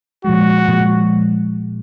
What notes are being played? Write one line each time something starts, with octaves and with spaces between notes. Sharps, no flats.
A#2 F3 G#3 F#4
A#2 F3 G#3